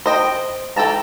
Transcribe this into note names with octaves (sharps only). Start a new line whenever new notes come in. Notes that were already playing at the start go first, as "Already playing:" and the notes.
C5 D#5 G5
E3 A4 G5 A5 A#5